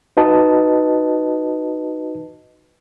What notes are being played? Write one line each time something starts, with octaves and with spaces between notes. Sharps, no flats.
D#4 F#4 B4 D#5 A5